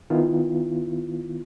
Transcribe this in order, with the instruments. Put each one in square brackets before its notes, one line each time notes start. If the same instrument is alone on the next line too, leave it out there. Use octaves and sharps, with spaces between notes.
[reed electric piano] D#3 B3 E4 F4